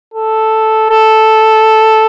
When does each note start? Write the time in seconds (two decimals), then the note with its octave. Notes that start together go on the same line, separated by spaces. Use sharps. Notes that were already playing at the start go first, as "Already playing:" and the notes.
0.14 A4
0.90 A4